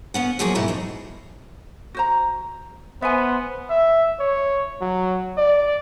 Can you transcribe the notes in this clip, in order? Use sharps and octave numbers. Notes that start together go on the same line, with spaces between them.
B3 C#4 F#5
F2 A2 F3 F#3 A#3 G#4
G#2 B2 E4 G4 A#4
F2 D#4
F#4 C5 A#5
B3 C5 E5 G#5
E5
C#5
F#3
D5